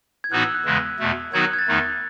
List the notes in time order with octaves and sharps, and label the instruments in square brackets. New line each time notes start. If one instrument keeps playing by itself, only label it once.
[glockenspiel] G#6
[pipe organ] A2 E3 B3 D#4 F#4 [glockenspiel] F#6
[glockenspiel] E6
F#6
[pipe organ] E2 C#3 E3 G#3
E2 B2 A3
[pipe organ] D#3 F#3 B3 D#4 F#4 [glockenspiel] G#6
[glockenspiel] F#6
G#6
A6
[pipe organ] E2 D#3 A3 D#4